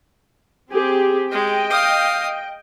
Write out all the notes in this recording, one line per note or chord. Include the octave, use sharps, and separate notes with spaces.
C4 G4 G#4
G#3 D#5 G5
F5 D#6